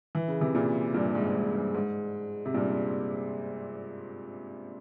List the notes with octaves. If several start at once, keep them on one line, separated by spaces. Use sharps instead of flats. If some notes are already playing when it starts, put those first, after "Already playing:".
E3
C#3
C3 E3
A#2 C#3
G2 A#2
G#2
G#2
G2
G#2
C3
G2 A#2